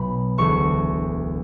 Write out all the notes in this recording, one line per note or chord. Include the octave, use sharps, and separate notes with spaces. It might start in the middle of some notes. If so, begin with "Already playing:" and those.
Already playing: B1 B2 B5
E1 D2 D3 C#6